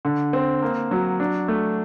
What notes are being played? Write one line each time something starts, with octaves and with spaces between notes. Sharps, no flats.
D3
C4
A#3
F#3
D4
A3